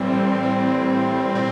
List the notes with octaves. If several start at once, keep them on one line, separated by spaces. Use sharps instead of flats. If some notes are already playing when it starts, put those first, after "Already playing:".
Already playing: A2 E3 G3 C4
A2 E3 G3
A#2 G3 C4